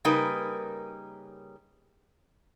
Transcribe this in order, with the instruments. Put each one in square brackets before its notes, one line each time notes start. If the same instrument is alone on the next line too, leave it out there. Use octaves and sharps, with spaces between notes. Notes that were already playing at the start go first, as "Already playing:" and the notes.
[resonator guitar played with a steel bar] C#3 G3 A#3 D#4 A#4 B4